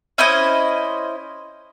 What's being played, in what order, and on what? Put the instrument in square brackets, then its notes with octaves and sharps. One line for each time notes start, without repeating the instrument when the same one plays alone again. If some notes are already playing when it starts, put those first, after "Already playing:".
[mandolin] C#4 E4 C5 D#5